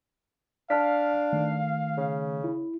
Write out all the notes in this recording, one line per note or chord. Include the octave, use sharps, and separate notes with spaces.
D4 F5 A5 F6 B6
D#3 A3
C#3
E4